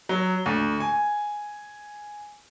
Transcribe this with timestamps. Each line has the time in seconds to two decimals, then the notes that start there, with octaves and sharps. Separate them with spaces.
0.09 F#3
0.46 D2
0.80 G#5